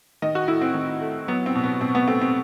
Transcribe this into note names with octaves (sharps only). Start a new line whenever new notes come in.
D#3 D#5
F#4
A3 E4
C4
D#3
A3
F#3 B3
C4
B2
B3
B2 C4
B3
A3 C4
C4